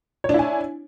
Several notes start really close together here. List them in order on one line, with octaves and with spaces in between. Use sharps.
C#5 D4 E4 G#5